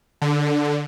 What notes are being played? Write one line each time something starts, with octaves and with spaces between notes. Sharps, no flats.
D3